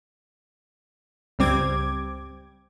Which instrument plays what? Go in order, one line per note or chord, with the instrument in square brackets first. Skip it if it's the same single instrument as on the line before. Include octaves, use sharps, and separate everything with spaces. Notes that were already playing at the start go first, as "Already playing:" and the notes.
[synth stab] C#2 G2 G3 C4 D6 G#6